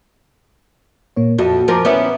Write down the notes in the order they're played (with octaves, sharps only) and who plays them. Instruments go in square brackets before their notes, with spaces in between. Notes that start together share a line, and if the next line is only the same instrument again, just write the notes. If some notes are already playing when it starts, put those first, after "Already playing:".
[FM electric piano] A#2 A#3 C#5
[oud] F2 [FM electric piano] F#4 E5 A5
[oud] F3 A#4 [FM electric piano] C5 G#5 D6
[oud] B3 C#4 E4